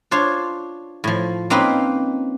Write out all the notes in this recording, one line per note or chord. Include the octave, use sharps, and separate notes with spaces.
D4 F4 C5 C#5
A2 F3
A#3 C4 C#4 D#4 B4 F5